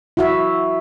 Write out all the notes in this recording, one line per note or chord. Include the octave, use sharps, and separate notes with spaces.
E4 F#4 E5